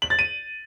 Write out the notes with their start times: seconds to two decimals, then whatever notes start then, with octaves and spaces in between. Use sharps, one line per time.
0.02 F#7
0.10 A6
0.19 D#7